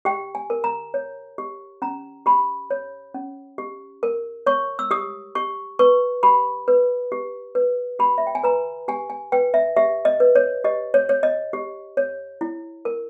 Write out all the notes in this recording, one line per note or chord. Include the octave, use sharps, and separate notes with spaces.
G4 G5
G#5
A#4
A#5
C#5
G4
C#4 A#5
G4 B5
C#5
C#4
G4
A#4
C#5 C#6
E6
G4 D#6
G4 C#6
B4 C#6
G4 B5
B4
G4
B4
G4 B5
E5
G5
G#5
B4 A#5
G4 G#5
G#5
B4 G5
E5
G4 E5
D#5
B4
C#5
G4 D#5
C#5
C#5
D#5
G4
C#5
E4
A#4